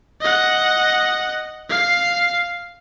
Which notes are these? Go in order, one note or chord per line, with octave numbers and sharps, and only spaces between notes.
D#5 F#5
F5 C7